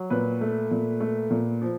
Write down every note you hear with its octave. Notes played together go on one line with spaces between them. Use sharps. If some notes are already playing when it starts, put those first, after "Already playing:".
Already playing: F#3
A#2 B4
A3
A#2
A3
A#2
F3